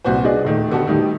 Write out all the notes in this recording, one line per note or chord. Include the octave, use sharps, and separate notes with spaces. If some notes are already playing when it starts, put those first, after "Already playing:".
C2 A#2 F#4 B4 C5
D4 F#4 G#4 D5 D#5
D#1 D#3 A3
D3 B3 F#4 G4 A4
A2 D#3 G3 D#4 G4